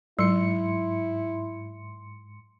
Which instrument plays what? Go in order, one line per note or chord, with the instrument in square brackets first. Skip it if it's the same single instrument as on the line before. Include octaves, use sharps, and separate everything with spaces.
[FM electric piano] G#2 C6 C#7 [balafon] F#3 [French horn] E4